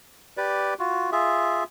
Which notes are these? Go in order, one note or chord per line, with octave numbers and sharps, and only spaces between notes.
G4 B4 D5
F4 F#4
F4 G#4 E5